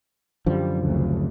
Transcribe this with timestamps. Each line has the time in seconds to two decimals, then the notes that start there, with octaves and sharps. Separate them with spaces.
0.46 F#2 D3 F3 G3
0.82 F1 D2 C#3